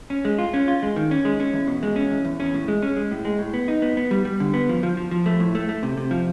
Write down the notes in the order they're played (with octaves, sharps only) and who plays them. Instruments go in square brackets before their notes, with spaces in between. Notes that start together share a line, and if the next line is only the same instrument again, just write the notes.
[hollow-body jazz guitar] C#4
G#3
F4
C#4
F4
G#3
D#3
C#4
G#3
C#4
E2
B2
G#3
C#4
E2
E2
C#4
A2
G#3
C#4
G#3
A2
G#3
A2
B3
D#4
B3
B3
G3
G3
D3
B3
F3
F3
F3
F3
A3
A2
A3
A3
C3
C3
F3